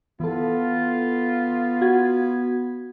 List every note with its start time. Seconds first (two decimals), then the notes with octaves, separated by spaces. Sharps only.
0.20 E3 B3 F4 A4
1.81 F#4 G#6